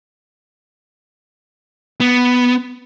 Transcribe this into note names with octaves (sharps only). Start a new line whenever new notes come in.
B3